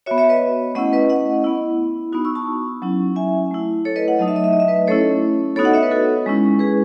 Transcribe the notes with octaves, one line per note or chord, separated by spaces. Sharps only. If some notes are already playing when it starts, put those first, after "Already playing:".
B3 F#4 C#5 E5
C#5 E5
B4 D#5
A3 C#4 E4 D#5 F#5
B4 D#5
D#5 F#5
B3 E4
B3 D#4 F#4
C#6 E6
A5 C#6
F#3 C#4 E4
E5 G#5
A3 E4
A4 C#5
B4 D#5
D#5 F#5
F#3 A3 D#4 D#5
E5
D#5
E5
D#5
E5
B4 D#5
A3 C#4 E4 A4 C#5
B3 D#4 F#4 A4 C#5
D#5 F#5
C#5 E5
B4 D#5
F#4 A4
G#3 C#4 E4
G#4 B4